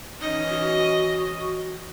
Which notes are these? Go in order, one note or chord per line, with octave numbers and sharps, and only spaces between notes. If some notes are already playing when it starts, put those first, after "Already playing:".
E3 C#4 D#4 D#5
F#4